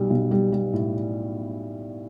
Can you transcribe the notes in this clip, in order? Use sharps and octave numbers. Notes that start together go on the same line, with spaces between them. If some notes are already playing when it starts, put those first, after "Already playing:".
Already playing: B1 G3
B1
G3
G3
A2